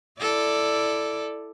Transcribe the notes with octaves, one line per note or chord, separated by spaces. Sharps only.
E4 A4 D5